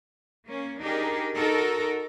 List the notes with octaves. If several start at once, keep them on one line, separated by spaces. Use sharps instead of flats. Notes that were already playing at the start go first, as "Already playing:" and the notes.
A#3 C#4
D4 D#4 G4 G#4 A#4
D#4 F#4 A4 A#4